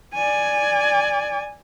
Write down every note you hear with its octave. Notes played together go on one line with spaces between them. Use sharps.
D5 G#5